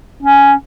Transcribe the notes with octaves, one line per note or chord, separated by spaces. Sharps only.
C#4